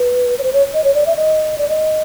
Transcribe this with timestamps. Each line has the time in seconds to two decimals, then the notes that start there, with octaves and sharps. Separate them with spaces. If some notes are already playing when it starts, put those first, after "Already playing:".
Already playing: B4
0.39 C#5
0.43 C5
0.53 C#5
0.74 D#5
0.84 C#5
0.95 D5
1.06 E5
1.16 D#5
1.58 D5
1.69 D#5